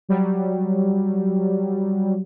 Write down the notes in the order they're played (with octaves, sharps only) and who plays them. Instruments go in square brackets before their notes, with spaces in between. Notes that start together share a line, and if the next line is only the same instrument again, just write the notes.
[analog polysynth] F#3 G3